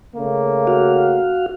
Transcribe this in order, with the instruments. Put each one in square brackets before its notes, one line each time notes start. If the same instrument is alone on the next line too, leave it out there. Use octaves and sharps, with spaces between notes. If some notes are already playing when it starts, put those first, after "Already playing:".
[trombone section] C#3 A3 A#3
[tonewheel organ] F#4 F5